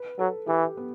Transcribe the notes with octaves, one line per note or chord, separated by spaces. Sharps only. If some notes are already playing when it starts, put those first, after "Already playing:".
Already playing: B4
F#3 A4
E3 G4
B3